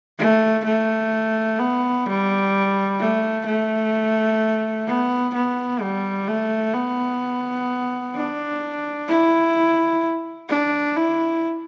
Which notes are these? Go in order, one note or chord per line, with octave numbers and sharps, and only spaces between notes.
A3
A3
B3
G3
A3
A3
B3
B3
G3
A3
B3
D4
E4
D4
E4